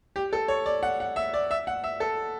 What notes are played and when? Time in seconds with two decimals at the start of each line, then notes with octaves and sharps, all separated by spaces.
0.16 G4
0.33 A4
0.48 C#5
0.66 D5
0.83 F#5
1.00 F#5
1.16 E5
1.34 D5
1.51 E5
1.67 F#5
1.84 E5
2.00 A4